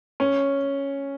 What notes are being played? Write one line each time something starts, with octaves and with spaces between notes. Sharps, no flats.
C#4